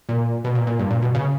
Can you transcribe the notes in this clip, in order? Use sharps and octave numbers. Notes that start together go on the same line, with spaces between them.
A#2
B2
A#2
A#2
G2
A#2
B2
C#3